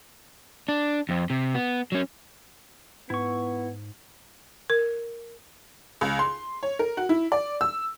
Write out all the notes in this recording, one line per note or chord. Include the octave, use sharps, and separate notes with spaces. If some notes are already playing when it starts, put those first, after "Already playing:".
D4
F2 C4
C3
B3
F#3 C#4
G#2 B3 E4 C#6
A#4
C#2
C6
C#5
A#4
F#4
E4
D5
E6